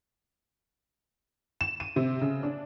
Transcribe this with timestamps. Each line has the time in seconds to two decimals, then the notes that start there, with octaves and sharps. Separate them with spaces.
1.61 E7
1.80 D#7
1.96 C3
2.22 C#3
2.43 D4